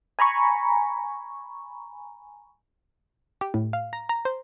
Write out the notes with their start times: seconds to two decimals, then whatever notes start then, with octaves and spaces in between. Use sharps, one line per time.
0.19 G#5 A#5 B5 C#6
3.41 G4
3.54 A2
3.73 F5
3.93 A#5
4.09 A#5
4.25 C5